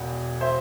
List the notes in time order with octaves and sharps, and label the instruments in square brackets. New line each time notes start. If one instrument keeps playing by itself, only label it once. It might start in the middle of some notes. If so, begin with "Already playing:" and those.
Already playing: [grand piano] E1 E2
C5 E5